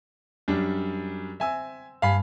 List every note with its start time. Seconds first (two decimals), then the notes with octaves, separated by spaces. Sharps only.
0.48 F#2 G3 D4
1.40 C4 E5 G#5 E6
2.02 G2 F5 G#5 B5